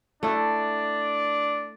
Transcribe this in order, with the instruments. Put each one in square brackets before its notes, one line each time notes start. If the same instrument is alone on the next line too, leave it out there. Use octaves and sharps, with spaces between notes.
[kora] A3 E4 [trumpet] D4